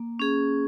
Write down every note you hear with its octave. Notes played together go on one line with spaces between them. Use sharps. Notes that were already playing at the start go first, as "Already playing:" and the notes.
Already playing: A#3
C#4 G#4